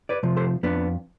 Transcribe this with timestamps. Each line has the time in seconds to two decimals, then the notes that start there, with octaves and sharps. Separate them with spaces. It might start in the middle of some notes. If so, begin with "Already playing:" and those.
0.09 B4 D5
0.23 C3 F3
0.36 A4 C5
0.63 F2 B3 D4